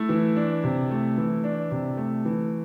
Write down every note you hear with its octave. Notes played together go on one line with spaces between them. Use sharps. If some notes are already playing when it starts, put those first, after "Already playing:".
Already playing: A3 E4
E3
D4
C3
A3
E3
D4
C3
A3
E3